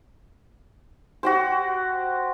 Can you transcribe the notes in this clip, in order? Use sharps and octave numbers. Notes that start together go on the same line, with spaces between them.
F#4 G4 C5